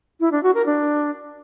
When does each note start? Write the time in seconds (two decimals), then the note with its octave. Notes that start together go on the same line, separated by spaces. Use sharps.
0.20 E4
0.32 D4
0.43 F#4
0.54 A#4
0.66 D4